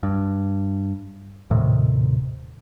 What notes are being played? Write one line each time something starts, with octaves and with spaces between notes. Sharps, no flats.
G2
D#1 A2 C3 D#3